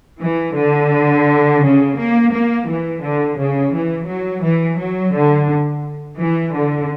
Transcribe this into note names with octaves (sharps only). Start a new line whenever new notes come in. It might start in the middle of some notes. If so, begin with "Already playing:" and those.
E3
D3
C#3
A#3
A#3
E3
D3
C#3
E3
F#3
E3
F#3
D3
E3
D3